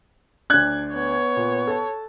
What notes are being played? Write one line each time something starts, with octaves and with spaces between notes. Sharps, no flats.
D2 D4 F#6 G#6
B3 C#5
A#2
A4 A5